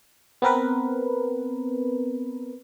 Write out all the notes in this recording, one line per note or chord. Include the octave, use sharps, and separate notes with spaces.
B3 C4 A#4 B4